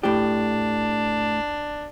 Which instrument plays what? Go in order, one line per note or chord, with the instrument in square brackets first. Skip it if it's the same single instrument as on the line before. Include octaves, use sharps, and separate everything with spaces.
[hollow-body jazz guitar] A2 G4 [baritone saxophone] D4